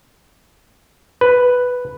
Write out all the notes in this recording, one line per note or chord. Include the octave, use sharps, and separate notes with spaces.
B4